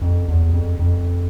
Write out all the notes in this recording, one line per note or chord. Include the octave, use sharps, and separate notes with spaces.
F2
E2
F2
F2